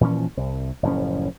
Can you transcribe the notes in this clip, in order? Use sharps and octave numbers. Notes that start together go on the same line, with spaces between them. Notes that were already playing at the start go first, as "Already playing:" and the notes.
A#2 E3 F3 C#4
C2
F#1 A2 F3 C#4